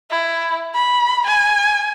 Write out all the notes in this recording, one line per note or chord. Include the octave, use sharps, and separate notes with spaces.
E4
B5
G#5